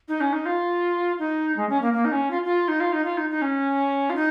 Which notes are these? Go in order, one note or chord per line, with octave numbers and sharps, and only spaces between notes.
D#4
C#4
D#4
F4
D#4
G#3
C#4
A#3
A#3
D#4
C#4
F4
F4
D#4
F4
D#4
F4
D#4
D#4
C#4
F4
D#4